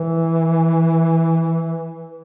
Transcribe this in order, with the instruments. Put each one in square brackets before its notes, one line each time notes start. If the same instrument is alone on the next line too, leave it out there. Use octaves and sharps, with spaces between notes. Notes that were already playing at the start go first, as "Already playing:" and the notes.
Already playing: [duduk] E3